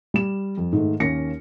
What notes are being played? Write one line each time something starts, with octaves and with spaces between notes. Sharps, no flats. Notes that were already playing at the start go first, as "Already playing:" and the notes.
G3 E7
F2
G#2 D#3 A3
D#2 A#3 C#4 A#6 C#7